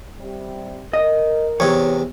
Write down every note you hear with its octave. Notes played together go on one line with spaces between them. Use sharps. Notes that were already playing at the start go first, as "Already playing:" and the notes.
C3 G3
A#4 D#5
E2 C3 C#5